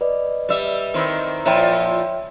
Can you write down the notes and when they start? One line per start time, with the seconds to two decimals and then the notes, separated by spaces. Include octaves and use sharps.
0.01 B4 D5 D#5
0.49 G3 E5
0.94 D#3 C4 E4
1.45 A#2 F3 E4 C#5 E5 G5